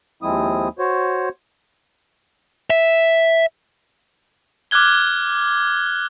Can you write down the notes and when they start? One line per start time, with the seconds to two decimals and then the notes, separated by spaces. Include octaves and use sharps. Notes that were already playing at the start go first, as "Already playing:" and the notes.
0.23 D#2 F3 G#3 C4 E4 D#6
0.79 F#4 C5 C#5
2.70 E5
4.71 D6 F6 F#6 G#6 G7